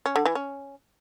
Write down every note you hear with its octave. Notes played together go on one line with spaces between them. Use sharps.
C#4
D3
E3
C#4